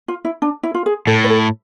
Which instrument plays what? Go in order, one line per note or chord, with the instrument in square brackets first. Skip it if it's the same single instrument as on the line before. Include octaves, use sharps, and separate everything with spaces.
[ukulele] F4
E4
D4
E4
F4
G#4
[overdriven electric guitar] A2 [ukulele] A4
[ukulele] B4
A4